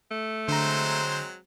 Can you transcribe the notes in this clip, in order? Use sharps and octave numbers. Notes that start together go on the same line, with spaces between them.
A3
D3 F#3 G#3 C4 C5 A#5